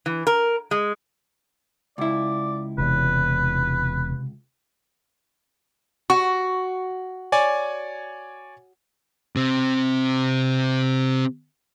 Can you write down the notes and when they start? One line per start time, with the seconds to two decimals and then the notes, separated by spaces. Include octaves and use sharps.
0.06 E3
0.27 A#4
0.71 G#3
1.98 C#2 E4 D5
2.78 E1 E2 C3 B4
6.10 F#4 C#6
7.32 C#5 D5 G#5
9.36 C3 C4